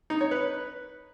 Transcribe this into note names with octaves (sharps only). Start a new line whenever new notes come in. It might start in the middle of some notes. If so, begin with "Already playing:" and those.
D#4
C#5
B4